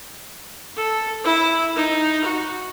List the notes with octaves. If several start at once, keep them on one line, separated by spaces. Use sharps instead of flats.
A4
E4
D#4
F#4